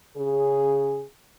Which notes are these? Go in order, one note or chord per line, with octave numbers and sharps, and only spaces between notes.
C#3 G#4